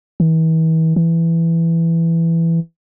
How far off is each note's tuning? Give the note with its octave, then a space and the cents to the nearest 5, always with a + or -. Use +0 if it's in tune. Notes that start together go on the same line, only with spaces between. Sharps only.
E3 -40
E3 +10